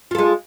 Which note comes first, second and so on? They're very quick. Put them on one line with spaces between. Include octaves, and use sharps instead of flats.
F4 A4 G#3